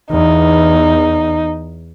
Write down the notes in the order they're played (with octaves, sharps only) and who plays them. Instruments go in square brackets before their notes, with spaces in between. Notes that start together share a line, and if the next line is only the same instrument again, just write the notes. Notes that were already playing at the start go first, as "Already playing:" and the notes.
[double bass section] E2 [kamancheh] D#4